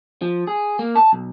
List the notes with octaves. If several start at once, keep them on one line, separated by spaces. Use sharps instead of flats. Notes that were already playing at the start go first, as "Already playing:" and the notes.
F3
G#4
A#3
A5
B1